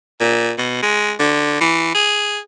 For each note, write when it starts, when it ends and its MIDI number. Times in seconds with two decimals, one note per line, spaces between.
0.20 0.52 46
0.58 0.79 47
0.82 1.13 56
1.19 1.57 50
1.61 1.94 52
1.95 2.39 68